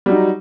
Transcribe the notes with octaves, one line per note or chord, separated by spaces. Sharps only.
F#3 G3 D#4